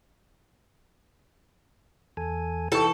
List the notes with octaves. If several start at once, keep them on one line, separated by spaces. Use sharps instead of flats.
E2 A4 G#5
E3 A4 G5 C#6